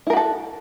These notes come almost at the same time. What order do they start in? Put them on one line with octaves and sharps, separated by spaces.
E4 A#4 F#4 A4